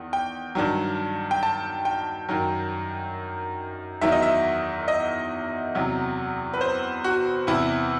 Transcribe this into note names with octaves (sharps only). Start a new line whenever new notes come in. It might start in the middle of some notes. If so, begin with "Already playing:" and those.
Already playing: E2 D#3
G5
G2 D#3 F#3
G5
A5
G5
F#2 D#3 F#3
E2 D#3 F#3 E5
D#5
E5
D#5
E2 C3 F#3
B4
C5
F#4
E2 C3 E3 E4